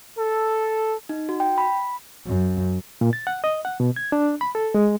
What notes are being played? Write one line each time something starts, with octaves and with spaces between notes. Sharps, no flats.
A4
D#4
F#4
G5
B5
F#2
A#2
A6
F#5
D#5
F#5
B2
G#6
D4
B5
A4
G#3